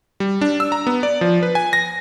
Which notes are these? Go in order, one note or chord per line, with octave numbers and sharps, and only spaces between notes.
G3
D4
E6
A#5
B3
D5
F3
B4
G#5
A#6